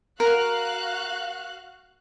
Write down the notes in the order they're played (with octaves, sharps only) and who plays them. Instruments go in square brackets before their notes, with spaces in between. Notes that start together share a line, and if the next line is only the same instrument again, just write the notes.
[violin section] F#4 F5 F#6 [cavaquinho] A#4